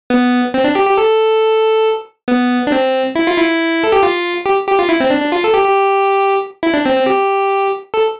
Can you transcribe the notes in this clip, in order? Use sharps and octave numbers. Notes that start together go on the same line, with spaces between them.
B3
C4
D4
G4
G4
A4
B3
D4
C4
E4
F4
E4
A4
G4
F4
G4
G4
F4
E4
C4
D4
D4
F4
A4
G4
G4
E4
D4
C4
C4
G4
A4